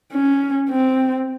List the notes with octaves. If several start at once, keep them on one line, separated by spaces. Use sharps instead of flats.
C#4
C4